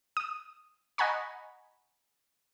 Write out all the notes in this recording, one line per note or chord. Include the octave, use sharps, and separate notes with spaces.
D#6
D#5 F#5 G#5 A#5 B5 C#6